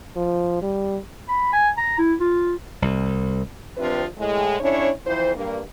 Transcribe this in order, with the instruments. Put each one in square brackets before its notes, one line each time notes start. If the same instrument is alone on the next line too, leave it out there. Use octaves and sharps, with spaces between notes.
[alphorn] F3
G3
[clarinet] B5
G#5
A#5
E4
F4
[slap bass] C2
[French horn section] C3 F3 C4 D4 F4 B4
A2 G#3
F2 C#4 D4 E4 C#5
F2 E3 C5
G2 A#3